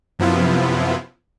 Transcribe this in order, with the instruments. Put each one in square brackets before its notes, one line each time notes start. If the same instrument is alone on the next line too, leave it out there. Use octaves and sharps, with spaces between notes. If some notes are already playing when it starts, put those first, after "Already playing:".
[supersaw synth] F#2 C3 F3 B3 E4 F4